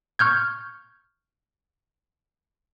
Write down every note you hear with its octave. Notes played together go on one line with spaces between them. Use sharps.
C#6 F6 G6 G#6